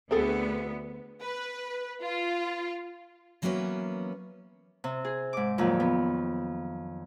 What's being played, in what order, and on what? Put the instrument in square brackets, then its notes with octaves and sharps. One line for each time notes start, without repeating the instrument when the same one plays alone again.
[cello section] D2 B3 [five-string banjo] C4 G#4 A4
[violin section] B4
F4
[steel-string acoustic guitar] E3 F#3 A#3 B3 C#4 B4
[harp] C3
G#4
G#2 D6
F2 A#2 D#3 F#3
B3